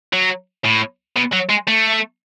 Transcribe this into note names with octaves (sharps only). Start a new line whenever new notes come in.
F#3
A2
B2
F#3
G#3
A3